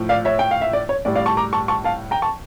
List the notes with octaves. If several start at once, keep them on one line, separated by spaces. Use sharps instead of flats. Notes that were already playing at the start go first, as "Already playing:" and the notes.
Already playing: A2 F3
D5 F5
C#5 E5
G5
F5
E5
D5
C#5
A2 G3 D5
D5 F5
A5 C#6
A#5 D6
A5 C#6
A5 C#6
F5 A5
G5 A#5
A5 C#6